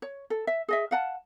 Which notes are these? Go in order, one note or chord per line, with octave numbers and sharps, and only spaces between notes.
C#5
A4
E5
G#4 D#5 E5
F5 F#5 A5